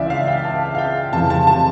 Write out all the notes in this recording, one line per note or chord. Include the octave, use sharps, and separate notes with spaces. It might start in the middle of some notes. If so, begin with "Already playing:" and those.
Already playing: C#2 C#3 E3 D5 E5
F5
G5
A5
F5
G5
F1 F2 C#3 E3 G3 A5
A5
A5